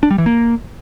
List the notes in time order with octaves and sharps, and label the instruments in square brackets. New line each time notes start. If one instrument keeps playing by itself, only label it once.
[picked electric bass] D4
G3
E3
A#3